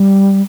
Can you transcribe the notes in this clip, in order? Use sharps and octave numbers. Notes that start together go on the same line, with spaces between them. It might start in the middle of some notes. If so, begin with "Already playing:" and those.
Already playing: G3